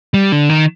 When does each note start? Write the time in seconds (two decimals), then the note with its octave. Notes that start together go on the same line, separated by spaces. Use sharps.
0.14 G3
0.32 D3
0.49 D#3